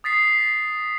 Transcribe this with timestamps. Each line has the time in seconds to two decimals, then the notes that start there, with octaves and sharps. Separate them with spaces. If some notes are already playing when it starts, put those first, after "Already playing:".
0.04 D#6 A6 B6 C7